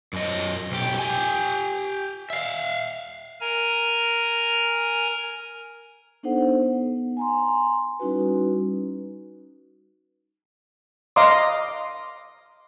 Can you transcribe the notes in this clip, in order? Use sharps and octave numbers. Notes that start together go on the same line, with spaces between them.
F#2 D#5
B1 G4
G4 G#5
E5 F5
A#4 G#5 A#5
B3 D4 D#4 A4 C5 F#5
B3
G#5 A#5 C6
G3 C#4 D#4 E4 F#4 B4
D#5 F5 A#5 C6 D6 D#6